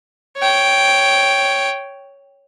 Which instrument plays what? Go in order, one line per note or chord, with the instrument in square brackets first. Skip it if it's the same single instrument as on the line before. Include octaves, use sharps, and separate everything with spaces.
[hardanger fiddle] C#5 G5